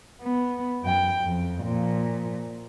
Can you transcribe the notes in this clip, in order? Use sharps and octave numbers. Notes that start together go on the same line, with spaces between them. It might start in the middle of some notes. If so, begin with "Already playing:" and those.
B3
F#2 G5
F2
A#2 F3